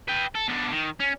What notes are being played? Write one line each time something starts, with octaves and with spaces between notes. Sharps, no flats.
B4 G5
A4
B2 D4
D#3
C#4